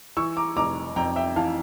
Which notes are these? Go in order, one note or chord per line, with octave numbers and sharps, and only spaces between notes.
E3 C#6 E6
A#5 D6
F1 A#5 D6
F2 G5 A#5
E5 G5
E3 F5 A5